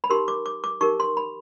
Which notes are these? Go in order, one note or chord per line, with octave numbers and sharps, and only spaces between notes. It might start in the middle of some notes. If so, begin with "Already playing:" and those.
B5
D#4 G4 A#4 C6
D6
D6
D6
D#4 G4 A#4 C#6
C6
B5